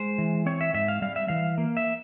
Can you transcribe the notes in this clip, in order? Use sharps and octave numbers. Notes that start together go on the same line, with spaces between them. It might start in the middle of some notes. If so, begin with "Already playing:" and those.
Already playing: G#3 C5
E3
C4 C#5
E5
G#2 E5
F5
G3 F5
E5
E3 F5
A#3
E5